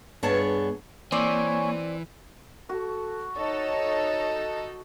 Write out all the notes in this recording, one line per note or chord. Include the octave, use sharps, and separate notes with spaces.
G2 B3 G#4 C#5 A5
E3 A#3 C4 C#5 D5 G#5
F#4 A4
D#4 A4 C#5 D#5